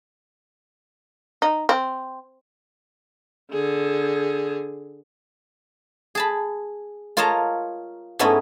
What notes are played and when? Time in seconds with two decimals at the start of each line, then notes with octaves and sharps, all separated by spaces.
1.42 D#4
1.69 C4
3.52 D3 G#4
6.15 G#4 A5 B5
7.17 F4 A#4 C#5 D#5 A5 A#5
8.19 G#2 A3 B3 C#4 E4 D#5